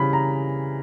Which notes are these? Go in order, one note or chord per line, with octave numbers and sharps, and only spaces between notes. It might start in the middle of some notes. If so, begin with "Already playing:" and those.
Already playing: C#3 E3 G3 B5
A#5